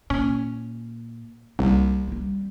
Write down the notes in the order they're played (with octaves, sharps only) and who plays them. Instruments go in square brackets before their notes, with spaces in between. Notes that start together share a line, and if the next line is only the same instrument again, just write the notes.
[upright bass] A#2 [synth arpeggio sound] C#4
[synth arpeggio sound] C2 [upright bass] G3 A#3
[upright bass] G3 C4